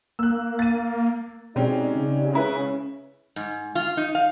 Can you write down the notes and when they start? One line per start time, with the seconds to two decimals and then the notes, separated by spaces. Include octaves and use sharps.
0.19 A#3 E6 F#6
0.59 A6 D#7
1.56 B2 G#3 C4 C#4 D#4 G4 D5
1.95 C#3
2.33 G#3 C#4 E4 B4
3.36 G#2
3.75 F4
3.97 D#4
4.15 F5